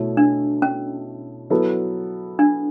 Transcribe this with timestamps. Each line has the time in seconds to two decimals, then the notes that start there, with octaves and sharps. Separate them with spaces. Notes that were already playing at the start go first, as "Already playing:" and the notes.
Already playing: B2 A3 E4 A4 C#5
0.17 D4
0.62 C#4
1.50 F#3 B3 E4 A4
2.39 D4